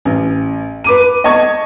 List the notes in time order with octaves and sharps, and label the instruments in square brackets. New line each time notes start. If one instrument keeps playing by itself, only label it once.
[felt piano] A1
B4 D6 D#7
D#5 A5 C#6 G#6